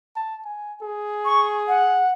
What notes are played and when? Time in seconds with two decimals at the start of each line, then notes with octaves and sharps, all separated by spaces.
0.16 A5
0.45 G#5
0.82 G#4
1.25 C#6
1.68 F#5